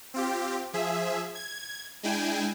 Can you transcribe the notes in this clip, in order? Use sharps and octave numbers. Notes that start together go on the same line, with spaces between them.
C4 F4 G4
F3 G#4 E5
G#6
G#3 D4 E4 G5 G#5